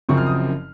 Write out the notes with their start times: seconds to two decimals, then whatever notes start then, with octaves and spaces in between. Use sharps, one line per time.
0.09 F#1 F#2 C#3 F3 C4 C#6
0.17 F6
0.27 D#6